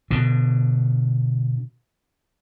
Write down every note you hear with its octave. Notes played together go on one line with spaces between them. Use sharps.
B2 D3